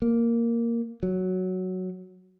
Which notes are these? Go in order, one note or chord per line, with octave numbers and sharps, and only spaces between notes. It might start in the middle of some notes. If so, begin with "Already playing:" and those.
A#3
F#3